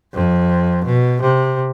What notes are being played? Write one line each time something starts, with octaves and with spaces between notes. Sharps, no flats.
F2
B2
C3